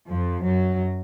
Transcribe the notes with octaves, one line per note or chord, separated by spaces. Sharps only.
F2 F3
F#2 F#3